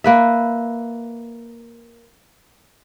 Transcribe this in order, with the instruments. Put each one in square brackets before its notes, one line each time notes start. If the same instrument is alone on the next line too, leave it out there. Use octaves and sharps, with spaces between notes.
[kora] A#3 B4 E5